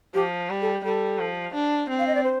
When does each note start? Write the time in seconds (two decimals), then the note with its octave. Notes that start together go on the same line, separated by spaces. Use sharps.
0.14 F3 G4
0.50 G3
0.62 A4
0.84 G3 A4
1.19 F3
1.54 D4
1.89 C4
1.99 F5
2.07 D#5
2.15 D5
2.24 C5